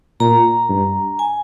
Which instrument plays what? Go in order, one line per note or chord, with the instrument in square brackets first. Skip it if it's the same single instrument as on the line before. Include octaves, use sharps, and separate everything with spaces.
[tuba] A#2 [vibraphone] A#5
[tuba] G2
[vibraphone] G#5